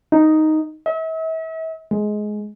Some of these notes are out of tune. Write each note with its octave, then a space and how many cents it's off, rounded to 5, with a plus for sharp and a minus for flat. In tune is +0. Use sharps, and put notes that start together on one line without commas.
D#4 +0
E5 -40
G#3 +15